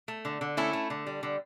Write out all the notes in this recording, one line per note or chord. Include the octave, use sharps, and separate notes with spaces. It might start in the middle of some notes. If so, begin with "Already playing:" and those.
A3
D3
D3
A3 C#4 E4
A3
D3
G3
D3